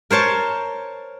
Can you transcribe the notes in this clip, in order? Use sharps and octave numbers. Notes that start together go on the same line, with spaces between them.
A#4 C5 C#5 A5